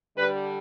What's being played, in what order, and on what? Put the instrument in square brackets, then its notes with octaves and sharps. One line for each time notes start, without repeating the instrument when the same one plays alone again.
[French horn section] D3 G3 B4